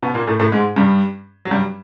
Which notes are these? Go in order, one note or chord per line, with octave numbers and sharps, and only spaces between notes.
B2 B3
A#2 A#3
A2 A3
A2 A3
G#2 G#3
G2 G3
F#3
G2 G3